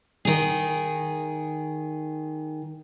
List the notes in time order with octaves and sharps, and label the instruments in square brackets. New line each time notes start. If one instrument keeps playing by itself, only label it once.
[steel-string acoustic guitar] D#3 G#4